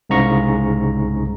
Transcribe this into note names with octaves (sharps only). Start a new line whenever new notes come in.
C2 G#2 C#3 A#5 C#6